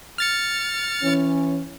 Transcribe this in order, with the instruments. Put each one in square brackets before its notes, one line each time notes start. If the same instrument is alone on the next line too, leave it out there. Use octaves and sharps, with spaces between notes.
[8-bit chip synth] F6 A6 C#7
[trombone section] E3 C#4